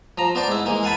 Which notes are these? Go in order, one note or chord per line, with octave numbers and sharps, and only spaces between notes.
F3 A#5
B3 C5 D5 A5
G#2 E4
E3 G#3 A#3
F5 F#5 G#5 A5 B5